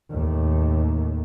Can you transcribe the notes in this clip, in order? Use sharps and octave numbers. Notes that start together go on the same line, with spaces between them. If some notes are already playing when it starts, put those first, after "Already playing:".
D#2 A2